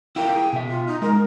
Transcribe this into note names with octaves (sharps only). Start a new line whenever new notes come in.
E4 F4 A#4 G5
G#4
B2 E5
F4
D#4
G#3 D#4 A#4